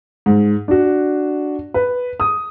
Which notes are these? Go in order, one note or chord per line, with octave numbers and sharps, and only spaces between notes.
G#2
D4 F#4
B4
D#6